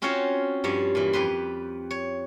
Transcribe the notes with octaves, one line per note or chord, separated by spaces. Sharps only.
C4 C#4 F4 F#4 C5 C#5
G2 F3 C#5
A#2 E3
F2 G4 B4 C6
C#5